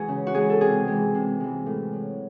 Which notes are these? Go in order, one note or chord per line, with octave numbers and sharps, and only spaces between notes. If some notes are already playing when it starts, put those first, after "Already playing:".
Already playing: E3 G#3 F#4 G#4
C#3
F#4
E3 G#3 G#4
A4
C3 G#4
E3 G#3
C3
E3 G#3
A2
F#3